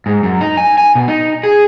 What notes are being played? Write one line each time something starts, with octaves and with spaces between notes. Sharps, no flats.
G#2
F#2
D#4
G#5
G#5
B2
D#4
G#4